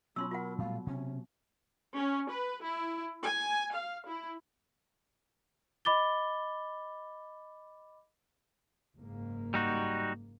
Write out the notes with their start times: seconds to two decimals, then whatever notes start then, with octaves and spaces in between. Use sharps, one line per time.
0.16 B2 F#3 C#4 F4 C6 E6
0.31 F4 A#4 F#5
0.58 A#2 G3 A3 F5
0.87 C3 C#4
1.97 C#4
2.31 B4
2.63 E4
3.25 G#5
3.75 F5
4.07 E4
5.85 D#5 B5 D6 A6 G7
8.96 F#1 G#2 A#3
9.54 G3 D#4 F#4